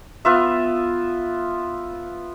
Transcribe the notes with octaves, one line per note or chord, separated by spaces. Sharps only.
B3 F4 E5